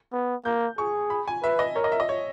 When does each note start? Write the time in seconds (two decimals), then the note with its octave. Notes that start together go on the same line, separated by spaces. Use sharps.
0.13 B3
0.45 A#3 G6
0.78 G#4 C#6
1.10 B5
1.28 G#5
1.43 B4 E5
1.59 D#5
1.75 A#4 C#5
1.84 D#5
1.92 E5
2.00 D#5
2.09 C#5